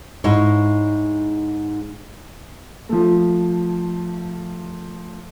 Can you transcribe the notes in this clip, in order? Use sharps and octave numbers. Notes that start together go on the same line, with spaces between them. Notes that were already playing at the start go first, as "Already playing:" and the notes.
G#2 D#4 E4 C#5
F3 A3